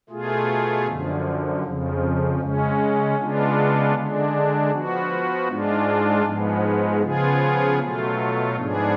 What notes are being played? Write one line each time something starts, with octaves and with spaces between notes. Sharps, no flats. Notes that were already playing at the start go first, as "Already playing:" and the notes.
B2 A3 F4 G#4
F#2 D3 F3
F2 C#3 F3
C#3 G#3 C#4
C#3 G#3 B3 D4 F4
D3 G#3 D4
F3 B3 F#4
G#2 G#3 D4 F4
G#2 F3 G#3 B3
C#3 F3 B3 F4 G#4
B2 F#3 A3 F4
G#2 F3 B3 D4 G#4